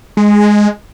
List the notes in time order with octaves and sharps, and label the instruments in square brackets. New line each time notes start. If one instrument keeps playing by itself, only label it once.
[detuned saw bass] G#3